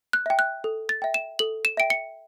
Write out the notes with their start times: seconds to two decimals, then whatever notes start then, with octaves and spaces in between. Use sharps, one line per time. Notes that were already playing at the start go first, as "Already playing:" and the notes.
0.13 F#6
0.26 E5 G5
0.39 F#6
0.64 A4
0.89 A6
1.02 E5 G5
1.14 E7
1.39 A4 F#7
1.65 E7
1.77 E5 G5 D7
1.90 C#7